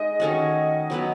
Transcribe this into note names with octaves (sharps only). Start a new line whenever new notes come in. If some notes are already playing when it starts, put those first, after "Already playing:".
Already playing: G#3 D#4 D#5
D#3 A3 C#4 F#4
F#3 B3 E4 B4